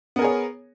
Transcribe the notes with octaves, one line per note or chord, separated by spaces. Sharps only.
B3 G#4 A#4 C#5